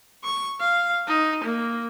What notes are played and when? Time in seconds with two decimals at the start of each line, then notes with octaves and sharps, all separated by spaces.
0.24 C#6
0.61 F5
1.07 D#4
1.44 A#3